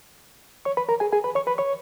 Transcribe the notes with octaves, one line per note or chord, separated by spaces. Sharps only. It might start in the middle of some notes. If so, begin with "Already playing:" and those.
C#5 C#6
B4 B5
A#4 A#5
G#4 G#5
G#4 G#5
B4 B5
C#5 C#6
B4 B5
C#5 C#6